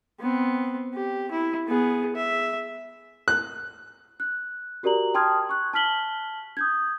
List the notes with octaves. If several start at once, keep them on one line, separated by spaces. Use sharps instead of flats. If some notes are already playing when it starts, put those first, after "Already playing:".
B3 C4
G4
E4
B3 G#4
E5
F#6
F#6
F#4 G4 A#4 D5 A#5 F#7
G5 A5 C6 D#6 F6 G#6
C#6 F#6
A5 F6 B6 F#7 G7
D#6 G6 G#6